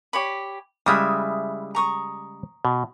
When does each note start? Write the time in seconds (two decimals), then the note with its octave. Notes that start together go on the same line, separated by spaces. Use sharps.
0.13 G4 C#5 B5
0.86 C#3 G3 G#3 E4 E5 D#6
1.75 A#5 C#6 D#6
2.65 B2